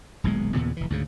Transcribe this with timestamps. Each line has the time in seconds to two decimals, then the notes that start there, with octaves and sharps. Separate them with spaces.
0.24 D#1 B1 B2 G#3
0.55 D#2 A#2 C#3 B3
0.77 F1 E3
0.90 D2 G#2 C#3